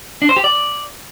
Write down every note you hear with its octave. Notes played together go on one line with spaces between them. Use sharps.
D4
C5
G4
D5